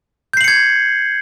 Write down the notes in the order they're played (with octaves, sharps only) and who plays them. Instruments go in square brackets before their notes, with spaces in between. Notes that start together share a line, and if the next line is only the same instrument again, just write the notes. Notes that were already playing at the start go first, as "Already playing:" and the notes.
[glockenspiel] G6
C7
F#7
C#7
G#6